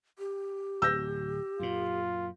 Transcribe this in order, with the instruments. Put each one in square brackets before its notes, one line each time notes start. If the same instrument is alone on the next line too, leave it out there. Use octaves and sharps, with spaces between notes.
[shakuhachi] G4
[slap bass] D1 [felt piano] E6 G6 A#6
[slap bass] F#2 A#2 [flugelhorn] F4